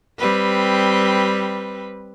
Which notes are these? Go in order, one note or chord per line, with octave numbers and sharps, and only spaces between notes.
G3 C4 B4